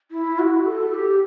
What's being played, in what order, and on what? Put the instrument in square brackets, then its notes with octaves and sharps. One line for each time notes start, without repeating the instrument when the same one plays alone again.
[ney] E4
F#4
A4
G4